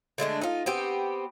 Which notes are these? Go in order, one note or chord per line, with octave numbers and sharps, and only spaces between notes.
D3 G#3 A3 D4
D#4 F4
B3 C4 G4